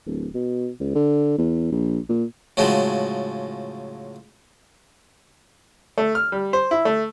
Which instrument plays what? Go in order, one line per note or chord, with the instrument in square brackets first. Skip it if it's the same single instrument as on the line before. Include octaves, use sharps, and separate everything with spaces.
[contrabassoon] D1
B2
C#2
D3
E2
A#1
A#2
[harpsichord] A2 C#3 F3 F#3 G#3
[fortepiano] A3
F6
G3
C5
E4
A3